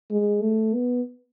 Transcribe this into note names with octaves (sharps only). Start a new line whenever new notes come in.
G#3
A3
B3